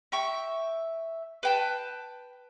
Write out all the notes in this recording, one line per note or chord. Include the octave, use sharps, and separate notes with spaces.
E5 G5 C#6
B4 G5 A5